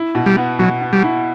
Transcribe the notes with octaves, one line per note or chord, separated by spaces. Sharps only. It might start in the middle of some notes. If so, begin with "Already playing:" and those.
Already playing: E4
B2
G3
B3
B2 F#3
B3
G3
E4